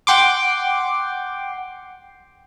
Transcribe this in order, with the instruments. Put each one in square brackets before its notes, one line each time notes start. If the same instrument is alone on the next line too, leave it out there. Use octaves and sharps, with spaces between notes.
[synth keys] F#5 G5 C6 D6